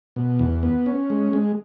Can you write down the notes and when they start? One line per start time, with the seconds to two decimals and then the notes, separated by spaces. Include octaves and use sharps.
0.16 B2
0.39 E2
0.63 B3
0.86 C#4
1.10 G#3
1.33 G#3